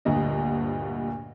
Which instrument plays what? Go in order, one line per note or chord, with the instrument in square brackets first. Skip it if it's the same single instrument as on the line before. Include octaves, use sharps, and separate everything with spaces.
[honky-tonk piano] D2 G2 A#2 D#5